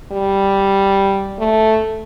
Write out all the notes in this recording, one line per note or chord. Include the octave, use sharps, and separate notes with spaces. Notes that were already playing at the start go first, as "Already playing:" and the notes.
G3
A3